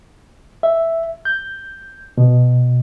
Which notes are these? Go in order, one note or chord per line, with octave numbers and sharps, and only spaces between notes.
E5
G6
B2